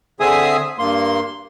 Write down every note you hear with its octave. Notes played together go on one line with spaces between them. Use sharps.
D3 C4 G#4 E5 G#5 D#6
G2 A#3 C6